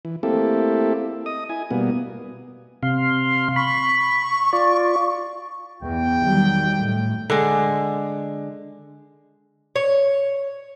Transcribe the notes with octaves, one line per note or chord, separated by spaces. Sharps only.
E3
A3 A#3 C4 E4 G4 A4
D#5 D#6
E4 G#5
B2 G3 A#3 B3
C3 F5 C6
B5 C#6
F4 D5
E2 G5
D#3 F#3 G3
A2
D3 G#3
C#5